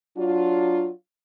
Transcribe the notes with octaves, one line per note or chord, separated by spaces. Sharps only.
F#3 D4 F4